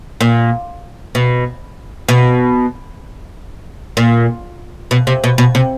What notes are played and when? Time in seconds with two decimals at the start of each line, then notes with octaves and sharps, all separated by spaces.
0.21 A#2
1.15 B2
2.09 B2
3.97 A#2
4.91 B2
5.07 C3
5.24 B2
5.38 B2
5.55 C3